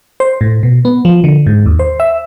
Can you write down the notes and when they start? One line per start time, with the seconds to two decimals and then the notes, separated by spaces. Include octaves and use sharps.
0.20 C5
0.41 A2
0.63 B2
0.85 B3
1.05 F3
1.24 D3
1.47 G#2
1.66 D#2
1.79 C5
2.00 E5